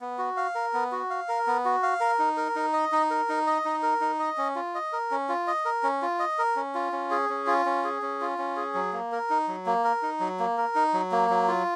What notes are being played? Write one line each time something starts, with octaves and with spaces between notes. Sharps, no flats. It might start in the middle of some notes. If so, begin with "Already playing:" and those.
B3
F#4
F5
A#4
B3
F#4
F5
A#4
B3
F#4
F5
A#4
D#4
A#4
D#4
D#5
D#4
A#4
D#4
D#5
D#4
A#4
D#4
D#5
C#4
F4
D#5
A#4
C#4
F4
D#5
A#4
C#4
F4
D#5
A#4
C#4
F4
C#4
G#4
C#4
F4
C#4
G#4
C#4
F4
C#4
G#4
F#3
A#3
A#4
D#4
F#3
A#3
A#4
D#4
F#3
A#3
A#4
D#4
F#3
A#3
F#3
F4